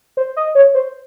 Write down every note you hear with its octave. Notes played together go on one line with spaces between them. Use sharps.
C5
D#5
C#5
C5